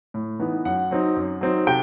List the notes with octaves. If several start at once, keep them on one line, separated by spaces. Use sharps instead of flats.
A2
E3 B3 D#4
F#2 F#5
F#3 C4 D#4
F#2
F#3 C4 D#4
C3 G5